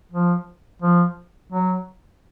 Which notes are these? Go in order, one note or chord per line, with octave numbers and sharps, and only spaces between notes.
F3
F3
F#3